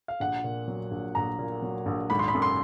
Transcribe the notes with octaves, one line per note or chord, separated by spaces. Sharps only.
F5
A#1 F#5
A#2
F#3
A#1
A#1 A#5
A#2
F#3
A#1
G#1 B5
C6
B5
F#2
C6